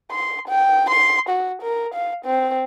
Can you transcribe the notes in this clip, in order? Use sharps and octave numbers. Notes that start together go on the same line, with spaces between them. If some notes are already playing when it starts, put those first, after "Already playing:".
C6
G5
C6
F#4
A#4
F5
C4